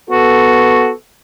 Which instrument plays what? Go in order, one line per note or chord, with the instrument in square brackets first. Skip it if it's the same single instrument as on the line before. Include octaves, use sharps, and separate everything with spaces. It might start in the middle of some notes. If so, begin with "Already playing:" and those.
[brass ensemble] B3 A4 [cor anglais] F#4